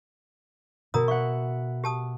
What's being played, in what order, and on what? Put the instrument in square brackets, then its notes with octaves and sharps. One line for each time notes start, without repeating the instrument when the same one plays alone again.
[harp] B2 [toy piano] A#4 A#5 D#6
[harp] E5 F#5 [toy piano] C#6
[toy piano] G4 A5 D#6